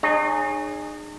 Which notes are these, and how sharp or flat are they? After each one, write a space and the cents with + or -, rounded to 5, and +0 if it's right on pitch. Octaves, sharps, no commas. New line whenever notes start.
D#4 -45 G#4 -15 C#5 +0